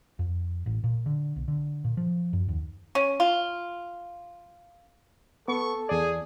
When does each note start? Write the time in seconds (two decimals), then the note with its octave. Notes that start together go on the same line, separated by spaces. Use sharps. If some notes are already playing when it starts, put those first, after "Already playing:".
0.19 F2
0.66 A1
0.84 A#2
1.06 D3
1.36 B1
1.48 D3
1.84 A#2
1.97 F3
2.33 F#2
2.49 D#2
2.95 C#4
3.20 F4
5.48 B3 A4 C#6
5.89 E2 G#4 D5